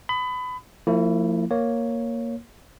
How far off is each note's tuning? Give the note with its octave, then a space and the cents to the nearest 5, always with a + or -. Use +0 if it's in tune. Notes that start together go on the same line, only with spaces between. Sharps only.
B5 +25 D#6 +0
F3 +10 A#3 -45 E4 +0
A#3 +0 C#5 +0